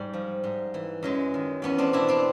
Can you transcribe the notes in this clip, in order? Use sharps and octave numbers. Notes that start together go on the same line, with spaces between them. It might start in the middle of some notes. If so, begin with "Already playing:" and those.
Already playing: G#2 G3
F3
G#2
E3
F#2 F#3 G#3
D#3
E2 B3 C#4
C4 D4
B2 D4 E4
C4 D4